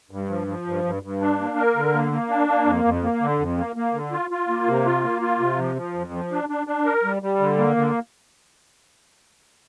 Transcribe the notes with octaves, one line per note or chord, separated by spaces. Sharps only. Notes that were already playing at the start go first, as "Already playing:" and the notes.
G2
F3
F3
G2
G2
G2
D4
A#3
A#4
D3
A#3
A#3
D4
A#3
F2
F2
A#3
D3
F2
A#3
A#3
D3
F4
F4
A#3
C3
F4
A#3
F4
C3
F3
F3
F2
F3
D4
D4
D4
A#4
G3
G3
D3
A#3
D3